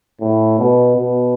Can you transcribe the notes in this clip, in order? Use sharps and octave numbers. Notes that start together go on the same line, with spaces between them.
A2
B2
B2